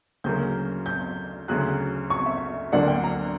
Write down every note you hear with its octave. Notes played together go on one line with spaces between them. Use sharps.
D2 C#3 F#3 A#3 G6
G6
D2 C#3 F#3 F#6
C#6
E5
D2 D3 F#3 A#3 D4 F#5
G5
A#5